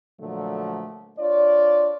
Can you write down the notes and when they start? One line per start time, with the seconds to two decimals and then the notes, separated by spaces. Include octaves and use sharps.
0.20 A#2 D3 F3 F#3 A3
1.19 D4 F4 C#5 D5